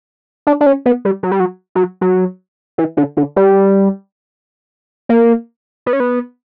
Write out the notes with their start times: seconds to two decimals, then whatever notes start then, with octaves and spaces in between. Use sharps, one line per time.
0.47 D4
0.61 D4
0.66 C#4
0.86 B3
1.05 G3
1.23 F#3
1.31 G3
1.40 F#3
1.75 F#3
2.01 F#3
2.78 E3
2.97 D3
3.17 D3
3.36 G3
5.09 A#3
5.86 B3
5.93 C#4
6.00 B3